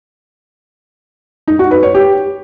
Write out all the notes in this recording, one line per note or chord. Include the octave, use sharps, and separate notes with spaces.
D#4
F#4
B4
C#5
G4